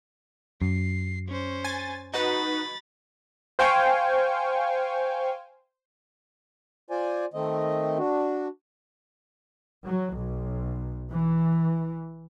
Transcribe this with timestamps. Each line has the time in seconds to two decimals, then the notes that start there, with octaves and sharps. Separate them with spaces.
0.62 F#2 C7
1.28 C#4 C5
1.64 G#5 A6
2.14 D#4 F#4 B4 B5 A6
3.59 C5 F5 G5 G#5 C#6
6.90 F4 C5 D5 G#5
7.34 D#3 A3 C4 D#5
7.98 D4 F#4
9.85 F#3
10.17 B1
11.11 E3